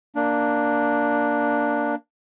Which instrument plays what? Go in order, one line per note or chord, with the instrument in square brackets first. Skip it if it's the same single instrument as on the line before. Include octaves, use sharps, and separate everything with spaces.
[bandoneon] A#3 D4